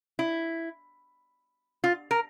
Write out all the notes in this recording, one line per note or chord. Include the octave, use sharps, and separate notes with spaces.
E4
F4
A#4